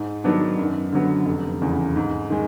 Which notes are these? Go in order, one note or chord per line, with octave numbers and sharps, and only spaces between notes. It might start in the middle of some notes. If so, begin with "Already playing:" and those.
Already playing: G#2
D#3 F#3 B3 D4
F#2
D3 F#3 B3
F1
E2 C#3
G#2
D#3 G#3